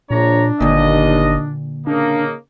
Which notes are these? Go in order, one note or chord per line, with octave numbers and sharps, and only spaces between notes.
A#1 A#2 D4 C#5 A#5
G1 D#2 A#2 D3 D#5
C#3 A#3 D4 D#4